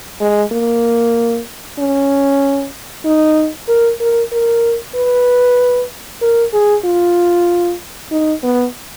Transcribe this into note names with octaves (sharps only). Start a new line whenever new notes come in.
G#3
A#3
C#4
D#4
A#4
A#4
A#4
B4
A#4
G#4
F4
D#4
B3